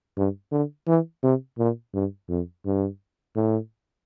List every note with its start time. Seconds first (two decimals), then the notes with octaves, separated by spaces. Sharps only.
0.17 G2
0.52 D3
0.88 E3
1.23 C3
1.59 A#2
1.94 G2
2.29 F2
2.66 G2
3.36 A2